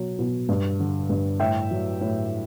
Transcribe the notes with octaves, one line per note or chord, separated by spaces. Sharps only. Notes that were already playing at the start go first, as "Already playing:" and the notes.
Already playing: B2 F#3
B2
G2
D3
G2
A2 E5 G5
F#3
A2